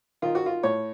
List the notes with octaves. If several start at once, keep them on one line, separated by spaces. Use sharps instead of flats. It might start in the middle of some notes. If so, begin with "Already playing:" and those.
D#3 F4
F#4
F4
A2 C#5